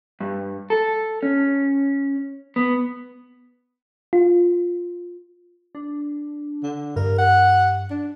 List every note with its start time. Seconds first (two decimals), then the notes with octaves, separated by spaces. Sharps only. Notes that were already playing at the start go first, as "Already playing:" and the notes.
0.20 G2
0.70 A4
1.23 C#4
2.56 B3
4.13 F4
5.75 D4
6.63 D3
6.96 G2 A#4
7.18 F#5
7.90 D4